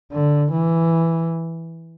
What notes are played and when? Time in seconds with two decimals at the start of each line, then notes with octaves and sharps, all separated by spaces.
0.12 D3
0.52 E3